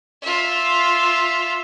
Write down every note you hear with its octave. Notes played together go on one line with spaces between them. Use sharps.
F4 E5